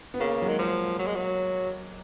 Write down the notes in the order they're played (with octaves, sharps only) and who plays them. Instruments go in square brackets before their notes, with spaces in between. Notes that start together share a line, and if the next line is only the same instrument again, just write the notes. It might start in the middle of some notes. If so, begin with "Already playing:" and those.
[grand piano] B3
[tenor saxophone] C#3 [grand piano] A#3
[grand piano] F#3
[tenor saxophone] D#3 [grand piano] G#3
[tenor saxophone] F3
F#3
G#3
F#3